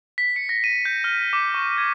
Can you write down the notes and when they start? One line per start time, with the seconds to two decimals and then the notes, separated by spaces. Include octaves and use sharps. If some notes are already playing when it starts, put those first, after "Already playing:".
0.18 B6
0.36 C#7
0.49 A#6
0.64 D#7
0.85 G6
1.04 F6
1.33 D6
1.54 C#6
1.78 G#6